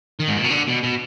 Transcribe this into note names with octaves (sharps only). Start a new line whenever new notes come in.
D#3
G#2
A#2
B2
D3
B2
B2